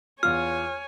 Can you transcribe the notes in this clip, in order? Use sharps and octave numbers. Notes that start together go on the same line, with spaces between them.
E2 F4 C#5 G#5 F6